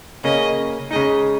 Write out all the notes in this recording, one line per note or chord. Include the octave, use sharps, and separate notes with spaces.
C#3 A#3 C#4 D#5
C#3 G#3 D#4 D#5